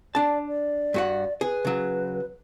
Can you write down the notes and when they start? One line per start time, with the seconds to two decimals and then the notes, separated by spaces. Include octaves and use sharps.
0.15 D4 D5 A5
0.48 D5
0.94 G2 F#4 F#5
1.41 G#4 B4
1.65 C#3 F#3